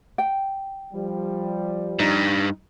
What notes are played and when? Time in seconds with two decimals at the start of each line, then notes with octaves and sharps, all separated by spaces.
0.18 G5
0.94 F3 G3
1.99 G2 D#4